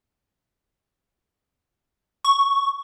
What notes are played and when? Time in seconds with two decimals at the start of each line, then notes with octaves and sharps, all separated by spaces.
2.24 C#6